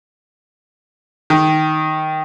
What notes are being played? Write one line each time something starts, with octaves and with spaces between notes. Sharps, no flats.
D#3